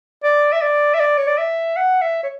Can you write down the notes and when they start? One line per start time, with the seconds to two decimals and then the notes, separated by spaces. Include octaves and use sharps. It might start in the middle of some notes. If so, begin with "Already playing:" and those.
0.24 D5
0.53 E5
0.62 D5
0.94 E5
1.00 D5
1.18 C#5
1.27 D5
1.38 E5
1.77 F#5
2.02 E5
2.23 C#5